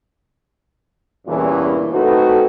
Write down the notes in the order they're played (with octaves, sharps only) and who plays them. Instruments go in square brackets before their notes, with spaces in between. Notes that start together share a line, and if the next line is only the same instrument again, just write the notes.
[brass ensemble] E2 G2 A#2 C#3 E3
A3 C4 D#4 F#4 A4 B4